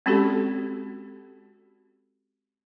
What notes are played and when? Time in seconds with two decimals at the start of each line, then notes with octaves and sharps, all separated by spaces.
0.06 G#3 C4 C#4 F#4 G4 A4